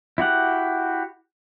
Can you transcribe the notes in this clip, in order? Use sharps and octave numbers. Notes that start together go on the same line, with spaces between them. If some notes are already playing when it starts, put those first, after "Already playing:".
E4 F#4 G4 F#5